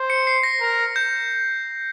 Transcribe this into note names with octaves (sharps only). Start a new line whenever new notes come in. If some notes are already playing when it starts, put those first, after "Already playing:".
Already playing: C5
C#7
C7
A#6
A#4
G6